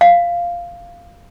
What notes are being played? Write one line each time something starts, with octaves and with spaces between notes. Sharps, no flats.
F5